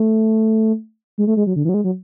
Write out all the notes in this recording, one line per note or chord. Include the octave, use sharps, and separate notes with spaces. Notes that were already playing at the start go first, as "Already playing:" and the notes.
Already playing: A3
G#3
A3
G#3
F#3
D3
E3
F#3
G#3
F#3